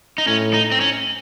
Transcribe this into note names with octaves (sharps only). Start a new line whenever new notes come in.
D#4
A2 C#4
D#4
C4
C#4